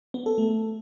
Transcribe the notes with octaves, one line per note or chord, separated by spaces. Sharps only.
B3
A4
A3